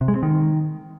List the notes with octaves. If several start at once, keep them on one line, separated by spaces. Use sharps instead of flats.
C3
G#3
C4
D#3